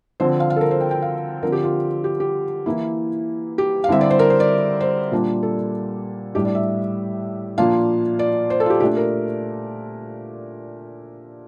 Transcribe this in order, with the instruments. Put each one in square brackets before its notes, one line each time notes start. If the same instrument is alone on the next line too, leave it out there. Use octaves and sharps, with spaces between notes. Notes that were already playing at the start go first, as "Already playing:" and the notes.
[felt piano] D3 F3 C4 C5
F5
F5
A4
A#4
C5
G5
G5
F5
D3 F3 C4 F4 A#4
G4
F4
G4
G4
E3 A#3 E4
G4
F5
D3 G3 C4 E4 E5
D5
C5
A#4
C5
D5
C5
A#2 G3 A#3 D4 F4
A4
A2 G3 D4 G4
D5
E5
A#2 F3 A#3 D4 F4 F5
D5
C5
A4
F4
G4
A#2 A3 D4 G4
A#4